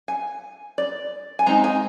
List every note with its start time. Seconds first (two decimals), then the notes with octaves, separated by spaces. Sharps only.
0.08 G#5
0.78 D5
1.39 G#5
1.46 G#3 C4 D#4 A#5
1.64 G#5